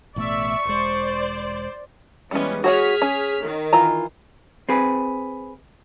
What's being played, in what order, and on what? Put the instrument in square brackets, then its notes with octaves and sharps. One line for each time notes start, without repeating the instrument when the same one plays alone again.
[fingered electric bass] A1 B2 A3 [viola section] D5 E5 [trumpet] C#6
[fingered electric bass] E1 G#3 [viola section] C5 D5
[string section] E3 G#3 C#4 [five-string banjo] G3 B3
[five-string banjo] F#4 C#5 F#5 [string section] G#4 F6 B6
[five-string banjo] C#4
[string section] D#3
[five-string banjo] E3 F4 A#5
[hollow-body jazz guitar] C4 G#4 B4